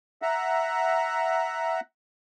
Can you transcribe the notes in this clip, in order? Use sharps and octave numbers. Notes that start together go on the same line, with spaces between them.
E5 F#5 A#5